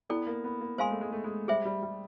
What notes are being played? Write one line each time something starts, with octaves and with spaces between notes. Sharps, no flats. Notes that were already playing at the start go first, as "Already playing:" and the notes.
B3 E4 A4 D5 G5
A#3
B3
A#3
G#3 C5 F5 G#5 C6
A3
G#3
A3
G#3
G3 G#4 C5 E5 G5
G3
G3